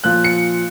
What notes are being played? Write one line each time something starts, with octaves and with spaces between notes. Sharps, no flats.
A#2 F3 F#6
C#7